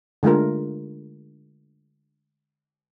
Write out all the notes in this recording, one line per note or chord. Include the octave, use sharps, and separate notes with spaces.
D3 G#3 A3 F4 A#4